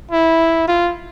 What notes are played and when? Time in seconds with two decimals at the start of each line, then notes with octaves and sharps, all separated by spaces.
0.11 E4
0.68 F4